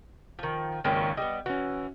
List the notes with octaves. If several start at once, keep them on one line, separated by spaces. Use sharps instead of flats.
D#3 F3
G#1 C#2 D#3 A#3 C#4
G3 B3 D#5
E3 C#4 F#4